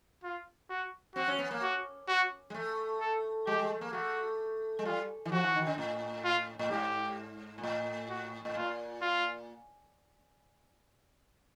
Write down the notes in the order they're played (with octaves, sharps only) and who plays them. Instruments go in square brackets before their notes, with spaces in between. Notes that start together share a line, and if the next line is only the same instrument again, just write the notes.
[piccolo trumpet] F4
F#4
[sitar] C4 [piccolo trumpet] F#4
[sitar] C#4
B3
A#3
[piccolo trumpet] F#4
F#4
[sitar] G#3
A3
[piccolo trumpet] A4
[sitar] G#3 [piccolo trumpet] G4
[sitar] G#3
A3
A#3
[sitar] A3 [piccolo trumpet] F#4
[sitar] G#3
[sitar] G3 [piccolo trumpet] F4
[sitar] E3
[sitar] F3 [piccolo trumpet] F#4
[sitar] E3
D#3
C#3
A2
[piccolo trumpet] F4
[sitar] A2
[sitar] G#2 [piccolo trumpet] G4
[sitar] A#2
A2
[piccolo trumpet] F#4
[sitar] A2
[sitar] A#2 [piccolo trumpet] F4
[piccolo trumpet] F4